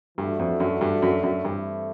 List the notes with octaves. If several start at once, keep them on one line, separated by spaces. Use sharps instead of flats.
G2 E3 A3 D4 F#4 A4
F2
F#2
G2
F#2
F#2
G2 E3 A3 C4 E4 A4